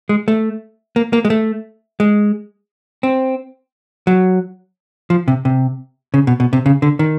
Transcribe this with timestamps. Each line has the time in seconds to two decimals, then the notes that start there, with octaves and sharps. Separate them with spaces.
0.09 G#3
0.28 A3
0.96 A#3
1.13 A#3
1.25 G#3
1.30 A3
2.00 G#3
3.03 C4
4.07 F#3
5.10 F3
5.28 C3
5.45 C3
6.14 C#3
6.27 B2
6.40 B2
6.53 C3
6.66 C#3
6.82 D3
6.99 D#3